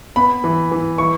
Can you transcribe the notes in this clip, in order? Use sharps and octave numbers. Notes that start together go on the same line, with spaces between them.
B3 B5
E3
E3
E3 C#6